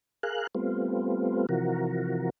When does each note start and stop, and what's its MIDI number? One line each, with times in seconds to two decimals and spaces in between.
0.23 0.47 68
0.23 0.47 70
0.23 0.47 77
0.23 0.47 90
0.55 1.46 55
0.55 1.46 57
0.55 1.46 59
0.55 1.46 60
0.55 1.46 65
1.49 2.30 48
1.49 2.30 52
1.49 2.30 53
1.49 2.30 66
1.49 2.30 70